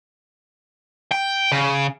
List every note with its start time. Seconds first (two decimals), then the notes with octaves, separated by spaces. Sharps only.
1.11 G5
1.52 C#3